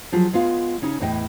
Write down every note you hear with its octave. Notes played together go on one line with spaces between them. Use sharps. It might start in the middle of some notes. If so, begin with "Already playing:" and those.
F3 F#3 F4 G#4
G#3 B3 F4 F5
C#3 C#4 D#4 G#4
E2 A2 E3 D#5 G5